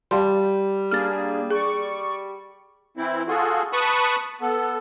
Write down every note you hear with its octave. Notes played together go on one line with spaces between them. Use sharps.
G3 F5 A5 C6
A#3 D4 G#4 F6 A6
G#4 D5 C#6
E3 C4 E4
F4 F#4 G#4 A4
B4 A5 B5 C#6 D#6
B3 A4